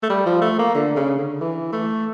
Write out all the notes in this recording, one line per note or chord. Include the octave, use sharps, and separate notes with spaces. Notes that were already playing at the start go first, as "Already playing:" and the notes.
A3
G3
F3
A3
A#3
D3
C#3
D3
E3
A3